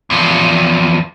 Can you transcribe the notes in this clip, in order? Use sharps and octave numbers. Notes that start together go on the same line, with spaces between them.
E2 F3